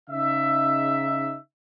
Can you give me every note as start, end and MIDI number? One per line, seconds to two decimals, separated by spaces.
0.10 1.37 49
0.10 1.37 63
0.10 1.37 76